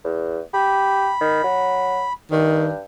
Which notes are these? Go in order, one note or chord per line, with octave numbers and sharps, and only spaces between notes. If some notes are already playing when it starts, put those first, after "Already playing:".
E2
G4 B5
D#3
F#3
G2 D#3